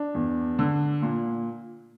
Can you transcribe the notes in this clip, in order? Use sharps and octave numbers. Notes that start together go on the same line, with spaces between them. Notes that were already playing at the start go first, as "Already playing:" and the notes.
Already playing: D4
E2
D3
A#2